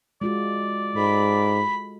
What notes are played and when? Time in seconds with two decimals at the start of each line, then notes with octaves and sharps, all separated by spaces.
0.21 G#3 F4 F#4 D5
0.95 G#2 A4 B5